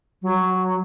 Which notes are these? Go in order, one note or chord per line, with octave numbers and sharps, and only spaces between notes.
F#3